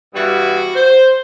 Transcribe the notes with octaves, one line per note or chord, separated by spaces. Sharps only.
G2 E3 G3 B3 F#4
C5